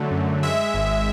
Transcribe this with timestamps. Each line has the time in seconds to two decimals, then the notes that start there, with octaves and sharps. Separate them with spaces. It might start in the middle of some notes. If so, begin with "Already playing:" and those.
Already playing: D3 F#3 A3
0.11 F#2
0.43 G#3 E5
0.74 G#1